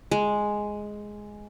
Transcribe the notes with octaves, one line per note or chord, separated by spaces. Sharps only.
G#3